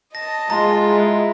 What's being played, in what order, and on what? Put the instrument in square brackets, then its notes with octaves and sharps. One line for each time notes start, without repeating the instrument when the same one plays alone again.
[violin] D#5 A5 [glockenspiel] A#6
[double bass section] G#3 [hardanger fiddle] F4 [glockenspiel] A#5
[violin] E4